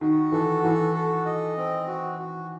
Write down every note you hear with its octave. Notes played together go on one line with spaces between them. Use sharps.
D#3 F#4
E3 A4
E3 F#4
A4
D#5
C4
F#4
F#4